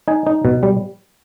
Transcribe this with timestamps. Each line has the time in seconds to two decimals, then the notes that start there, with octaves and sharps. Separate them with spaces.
0.08 D#4 G#5
0.27 D#4
0.45 B2
0.63 G3